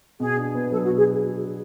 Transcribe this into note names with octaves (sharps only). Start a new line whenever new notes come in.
B2 G#4
D4
B3
F#3 A4
F#4
B2
G#4